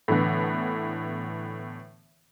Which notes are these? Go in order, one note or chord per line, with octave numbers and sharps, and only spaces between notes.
A2 D3 E3 B3